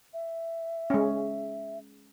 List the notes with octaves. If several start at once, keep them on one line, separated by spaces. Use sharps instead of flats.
E5
G#3 C#4